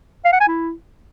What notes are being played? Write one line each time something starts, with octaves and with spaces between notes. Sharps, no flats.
F5
F#5
G#5
E4